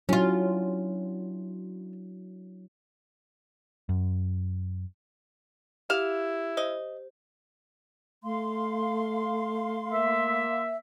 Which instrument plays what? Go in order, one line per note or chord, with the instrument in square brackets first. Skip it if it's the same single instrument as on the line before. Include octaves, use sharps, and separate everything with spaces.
[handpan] F#3 D4 E4 [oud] C#4 F4
[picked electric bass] F#2
[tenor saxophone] E4 [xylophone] G4 [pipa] F5
[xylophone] C5 [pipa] D#5
[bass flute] A3 [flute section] F5 C6
[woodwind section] A#3 E5